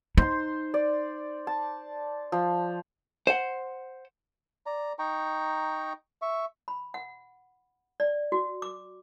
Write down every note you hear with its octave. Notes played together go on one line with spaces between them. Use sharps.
D#4 C5 C6
D5
A5
F3
C5 F#5
D5 A#5
D#4 G5 A#5 C#6
E5 C#6
B5
F#5
D5
F#4
D6